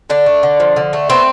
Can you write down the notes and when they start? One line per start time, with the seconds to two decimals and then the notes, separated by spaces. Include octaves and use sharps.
0.10 D3 D4
0.26 A3
0.43 D3
0.60 F3
0.76 D3
0.93 A3
1.10 B3 C4